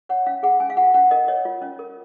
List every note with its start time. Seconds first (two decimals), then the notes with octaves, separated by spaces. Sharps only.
0.09 C#5 F#5
0.26 C#4 F5
0.43 G#4 F#5
0.60 C#4 G#5
0.70 F5
0.77 F4 F#5
0.94 C#4 F#5
1.11 A#4 D#5
1.28 C#5 D#5
1.45 F4
1.62 C#4
1.79 A#4